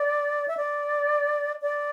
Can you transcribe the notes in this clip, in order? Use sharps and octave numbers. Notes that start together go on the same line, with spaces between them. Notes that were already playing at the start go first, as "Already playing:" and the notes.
Already playing: D5
E5
D5
D5